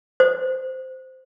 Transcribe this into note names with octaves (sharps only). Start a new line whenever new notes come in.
C5